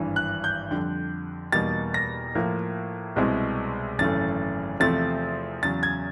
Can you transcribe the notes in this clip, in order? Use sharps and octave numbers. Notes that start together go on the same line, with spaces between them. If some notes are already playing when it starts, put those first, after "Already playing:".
Already playing: G#1 G2 E3
F#6
G6
F2 D3 G3
E2 B2 G3 A#3 D#4 A6
A#6
A2 F3 A#3
C2 B2 G#3 C4 E4
G#1 F#2 C#3 E3 A3 A6
E2 C3 F3 A3 C4 A6
E2 C#3 F#3 A6
G#6